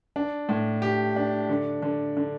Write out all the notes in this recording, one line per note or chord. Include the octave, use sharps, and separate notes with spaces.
D4
A2
G4
D4
D3
D3
D3